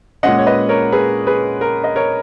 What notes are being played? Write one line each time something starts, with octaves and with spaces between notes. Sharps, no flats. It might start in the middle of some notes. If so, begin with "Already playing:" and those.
A#2 G#3 C#4 D#5 F#5
C#5
B4 D#5
A#4 C#5
G#4 B4
G#4 B4
A#4
D#5
A#4 C#5